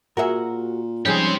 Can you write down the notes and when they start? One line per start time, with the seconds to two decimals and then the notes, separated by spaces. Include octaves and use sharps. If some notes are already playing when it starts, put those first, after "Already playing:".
0.17 A#2 F#4 G#4 A#4 E5
1.05 F2 G#2 G3 C#4 G4 G#4 C5